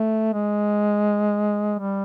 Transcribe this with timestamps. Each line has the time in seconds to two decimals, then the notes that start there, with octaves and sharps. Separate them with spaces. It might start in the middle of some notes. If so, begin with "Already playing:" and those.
Already playing: A3
0.33 G#3
1.79 G3